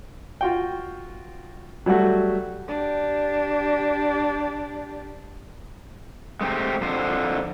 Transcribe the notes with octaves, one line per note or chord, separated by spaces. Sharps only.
F4 F#4 G5
F#3 G3 A3 F#4
D4 G4
G#3 A3 C4 G4
F2 D3 C5